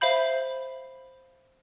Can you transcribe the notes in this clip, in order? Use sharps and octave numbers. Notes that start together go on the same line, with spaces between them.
C5 E5 F5 B5 G6